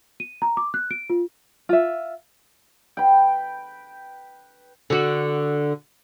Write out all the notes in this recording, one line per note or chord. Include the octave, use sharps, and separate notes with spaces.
D#7
A#5
D6
F#6
D7
F4
F4 E5
B4 G5
D3 F#4